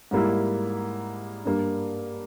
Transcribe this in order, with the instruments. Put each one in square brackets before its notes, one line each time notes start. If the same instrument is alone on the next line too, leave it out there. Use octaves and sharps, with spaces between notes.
[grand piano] G#2 G3 A#3 E4
G2 G3 A#3